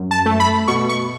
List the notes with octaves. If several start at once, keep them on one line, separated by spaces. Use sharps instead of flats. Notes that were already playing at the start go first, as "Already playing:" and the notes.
Already playing: F#2
A5
A3
B5
B2 C#6
C#6